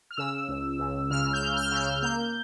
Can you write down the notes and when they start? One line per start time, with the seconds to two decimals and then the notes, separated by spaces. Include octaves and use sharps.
0.11 F6
0.17 C#3 E6
0.48 C#2
0.79 C#2
1.10 C#3 F6
1.33 G6
1.41 C#3
1.57 F6
1.72 C#3 G6
1.79 F6
2.02 A#3 G6